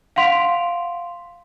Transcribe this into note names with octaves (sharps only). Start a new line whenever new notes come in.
F5 F#5 C6 B6 D7 F7